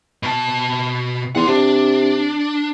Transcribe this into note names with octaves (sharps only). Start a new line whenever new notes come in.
B2 A5
E2 F#5 C6
C3 D4